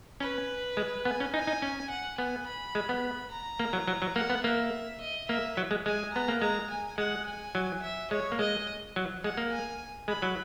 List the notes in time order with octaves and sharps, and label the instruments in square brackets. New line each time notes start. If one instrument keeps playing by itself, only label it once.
[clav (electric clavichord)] C#4 [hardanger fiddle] B4
[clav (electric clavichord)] G#3
[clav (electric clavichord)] B3 [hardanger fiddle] G#5
[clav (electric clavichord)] C#4
[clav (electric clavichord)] D#4 [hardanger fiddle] G#5
[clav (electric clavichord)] D#4
C#4
[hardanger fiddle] F#5
[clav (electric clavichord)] B3 [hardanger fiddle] G#5
[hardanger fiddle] B5
[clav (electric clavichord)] G#3
B3
[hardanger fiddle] A#5
[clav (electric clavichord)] A#3
F#3
F#3
F#3
[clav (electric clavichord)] A#3 [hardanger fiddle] F#5
[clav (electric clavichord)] B3
[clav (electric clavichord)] A#3 [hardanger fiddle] E5
[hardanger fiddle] D#5
[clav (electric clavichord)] A#3 [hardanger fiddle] E5
[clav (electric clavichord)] F#3
G#3
[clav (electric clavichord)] G#3 [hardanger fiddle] G#5
[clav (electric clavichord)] B3 [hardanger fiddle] A#5
[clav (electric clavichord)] A#3
[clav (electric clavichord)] G#3 [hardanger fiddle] A#5
[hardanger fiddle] G#5
[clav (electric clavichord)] G#3 [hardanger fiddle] F#5
[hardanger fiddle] G#5
[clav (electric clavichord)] F#3
[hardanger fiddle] E5
[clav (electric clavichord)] G#3 [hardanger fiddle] C#5
[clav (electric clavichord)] A#3
[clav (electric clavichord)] G#3 [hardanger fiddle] D#5
[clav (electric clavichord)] F#3
[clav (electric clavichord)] G#3 [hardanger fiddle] F#5
[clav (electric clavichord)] A#3
[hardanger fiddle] G#5
[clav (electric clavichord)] G#3 [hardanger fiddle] B5
[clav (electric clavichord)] F#3